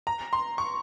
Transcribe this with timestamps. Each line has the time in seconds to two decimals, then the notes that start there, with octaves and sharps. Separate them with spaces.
0.07 A#5
0.33 C6
0.58 C#6